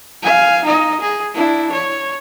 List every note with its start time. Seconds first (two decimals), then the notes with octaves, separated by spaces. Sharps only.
0.23 F5 G#5
0.65 D#4 D#5
1.01 G#4
1.34 D4 E4
1.72 C#5